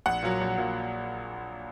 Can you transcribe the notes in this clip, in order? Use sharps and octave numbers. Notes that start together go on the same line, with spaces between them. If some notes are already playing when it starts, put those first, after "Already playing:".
A#1 F#5
A#2 F#3
A#1
A#2 F#3